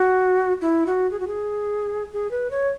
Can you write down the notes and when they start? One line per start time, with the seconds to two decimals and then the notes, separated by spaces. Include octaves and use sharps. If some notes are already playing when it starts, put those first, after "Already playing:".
Already playing: F#4
0.61 E4
0.87 F#4
1.11 G#4
1.20 F#4
1.27 G#4
2.13 G#4
2.31 B4
2.51 C#5